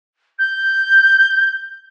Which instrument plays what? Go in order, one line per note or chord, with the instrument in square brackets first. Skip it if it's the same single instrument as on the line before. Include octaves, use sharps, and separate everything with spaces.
[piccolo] G6